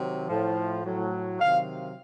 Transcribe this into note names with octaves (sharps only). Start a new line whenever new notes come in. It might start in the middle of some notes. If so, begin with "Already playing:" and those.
Already playing: C3 D#3 F#3
A2 F3
A2 F#3
C3 D#3 F#3 F5